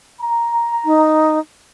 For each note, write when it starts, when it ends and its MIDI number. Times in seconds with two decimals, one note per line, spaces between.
0.21 1.29 82
0.85 1.39 63